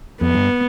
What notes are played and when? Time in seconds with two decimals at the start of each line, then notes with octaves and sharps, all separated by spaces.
0.21 F2 B3
0.34 G2